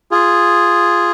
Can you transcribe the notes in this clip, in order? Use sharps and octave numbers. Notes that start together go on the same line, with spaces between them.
F4 G#4